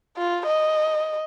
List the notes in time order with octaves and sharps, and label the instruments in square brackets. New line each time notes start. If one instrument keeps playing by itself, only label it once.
[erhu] F4
D#5